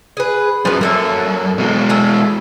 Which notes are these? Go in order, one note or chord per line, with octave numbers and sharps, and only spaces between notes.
G#4 B4
F#2 F3 B3
F#2 A#3 A4 E5
B2 G#3
E3 A3 A4